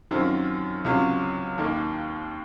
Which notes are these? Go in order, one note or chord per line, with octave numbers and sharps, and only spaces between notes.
F#2 D#3 F#3 C4 F4
C#2 C3 F#3 C#4 F4
D#2 D#3 A#3